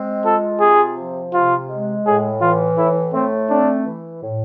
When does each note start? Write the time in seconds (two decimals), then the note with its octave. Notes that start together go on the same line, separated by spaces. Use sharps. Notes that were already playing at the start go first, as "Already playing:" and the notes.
Already playing: G#3 C4
0.25 F4 A4
0.60 C3 G#4
0.96 F3
1.33 C3 F4
1.69 G#3
2.06 A2 G#4
2.41 E3 F4
2.77 A2 E4
3.13 A3 C4
3.50 C4 D4
3.86 E3
4.23 A2